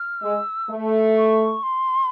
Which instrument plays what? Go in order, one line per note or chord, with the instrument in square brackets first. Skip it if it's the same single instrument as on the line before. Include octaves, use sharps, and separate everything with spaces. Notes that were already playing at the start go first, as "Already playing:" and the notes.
Already playing: [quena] F6
[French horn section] G#3 [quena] E6
[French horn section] A3
[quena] C#6
C6